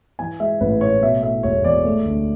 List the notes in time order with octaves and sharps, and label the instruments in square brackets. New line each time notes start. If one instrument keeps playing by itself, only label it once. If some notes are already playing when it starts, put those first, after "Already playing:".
[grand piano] E3 G#5
G#3 E5
A1 B4
A2 C#5
B2 E5
A3 E5
E1 C#5
E2 D5
A3
D2